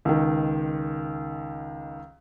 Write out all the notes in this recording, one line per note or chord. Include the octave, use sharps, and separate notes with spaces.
C#2 D#3